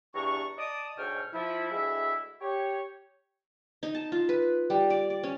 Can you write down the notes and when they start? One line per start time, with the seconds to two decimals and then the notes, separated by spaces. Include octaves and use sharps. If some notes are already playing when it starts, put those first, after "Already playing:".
0.15 E2 G2 D4 A#5 C#6
0.59 D5 D#5 A5 D6 D#6
0.98 D2 G#2 B2 C#5 G5 F6
1.34 F3 E4
1.72 D2 G#3 E4 E5
2.42 G4 C#5
3.83 D#4
3.95 A5
4.12 F4
4.29 B4
4.70 G3
4.90 D5
5.10 D5
5.23 C#4